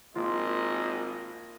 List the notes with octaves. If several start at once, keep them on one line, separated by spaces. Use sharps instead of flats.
G#1 A#3 F4 D#5